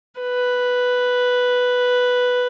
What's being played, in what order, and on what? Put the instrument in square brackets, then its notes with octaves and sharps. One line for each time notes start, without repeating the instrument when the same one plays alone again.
[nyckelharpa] B4